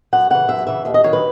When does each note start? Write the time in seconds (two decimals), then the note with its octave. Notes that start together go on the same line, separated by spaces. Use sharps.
0.13 F#2 F#5
0.30 C#3 E3 F#5
0.48 F#2 E5
0.67 C#3 E3 E5
0.85 D#2 E5
0.94 D#5
1.04 D#3 F#3 C#5
1.13 B4